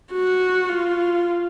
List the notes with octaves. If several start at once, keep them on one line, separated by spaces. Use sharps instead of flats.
F#4
F4